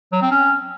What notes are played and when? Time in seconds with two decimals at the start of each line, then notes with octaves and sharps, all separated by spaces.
0.12 F#3
0.22 C4
0.31 C#4